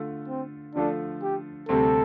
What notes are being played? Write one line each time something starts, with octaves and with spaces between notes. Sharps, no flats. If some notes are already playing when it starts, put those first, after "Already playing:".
Already playing: D3 A3 F4 A4
C4
D3 F3 A3 D4 F4 A4
G4
D2 C3 G3 C4 A4